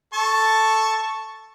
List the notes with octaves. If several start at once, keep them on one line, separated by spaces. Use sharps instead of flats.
A4 A5 C#6